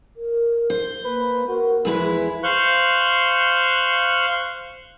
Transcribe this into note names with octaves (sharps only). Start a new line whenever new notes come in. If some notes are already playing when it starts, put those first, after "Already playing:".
A#4
C5
A#3 B4
F#4 A#4
E2 F3 G#3 E4 B4
C5 F5 C#6 F#6 G6